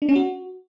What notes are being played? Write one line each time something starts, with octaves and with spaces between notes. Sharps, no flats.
D4
C#4
F#4